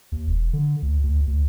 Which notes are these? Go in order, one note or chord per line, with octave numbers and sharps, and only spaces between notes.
D#2
E1
D3
D2
D2
D2